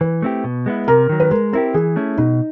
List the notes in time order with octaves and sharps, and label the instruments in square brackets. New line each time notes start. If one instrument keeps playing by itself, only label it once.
[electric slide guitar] E3 [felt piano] B4
[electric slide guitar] A3 C4 E4 G4
B2
G#3 B3 E4
[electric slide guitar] C3 [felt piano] A#4
[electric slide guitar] D#3 F#3
[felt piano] B4
[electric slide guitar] G#3 [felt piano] A#4
[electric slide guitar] C4 E4 G4 [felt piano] A#4
[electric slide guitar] E3 [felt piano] G#4
[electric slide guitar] A3 C#4 E4
[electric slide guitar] B2 [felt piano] D#4